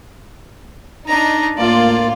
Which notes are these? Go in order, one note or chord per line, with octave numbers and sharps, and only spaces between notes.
D4 D#4 A#5
A2 A#3 F4 D5